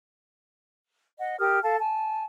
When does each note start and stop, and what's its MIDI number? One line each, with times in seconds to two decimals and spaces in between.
1.19 1.38 75
1.19 1.38 78
1.39 1.59 67
1.39 1.59 70
1.39 1.59 87
1.39 1.59 89
1.63 1.77 69
1.63 1.77 77
1.63 1.77 81
1.79 2.24 80
1.79 2.24 81